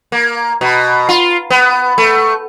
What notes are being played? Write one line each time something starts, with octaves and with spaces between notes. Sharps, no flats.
A#3
B2
F4
B3
A3